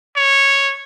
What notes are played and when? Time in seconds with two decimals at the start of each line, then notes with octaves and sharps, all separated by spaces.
0.16 C#5